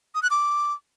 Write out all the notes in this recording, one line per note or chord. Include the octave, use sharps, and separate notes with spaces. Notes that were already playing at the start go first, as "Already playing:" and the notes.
D#6
F#6
D6